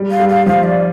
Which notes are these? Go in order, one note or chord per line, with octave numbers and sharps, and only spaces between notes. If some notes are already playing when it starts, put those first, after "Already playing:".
Already playing: G3
F5
G3
F5
F3 F5
D5